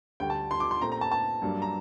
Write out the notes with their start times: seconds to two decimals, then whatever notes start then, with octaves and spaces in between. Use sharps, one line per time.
0.20 D2 D3 G3 G5
0.30 A5
0.51 C6
0.60 D6
0.71 C6
0.80 A#2 A3 C4 A#5
0.92 A#5
1.01 A5
1.11 A5
1.42 G2 F#3 A#3 D4
1.62 A#5